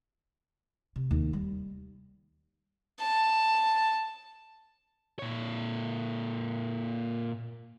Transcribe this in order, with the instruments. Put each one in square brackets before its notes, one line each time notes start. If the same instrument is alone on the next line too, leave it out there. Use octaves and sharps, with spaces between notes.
[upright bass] C3
D#2
G3
[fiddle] A5
[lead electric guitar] A#2 C#5